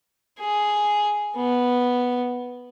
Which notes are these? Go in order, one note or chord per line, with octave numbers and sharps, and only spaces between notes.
G#4
B3